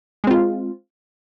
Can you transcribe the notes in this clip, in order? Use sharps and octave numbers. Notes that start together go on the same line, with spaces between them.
G#3 C4 F4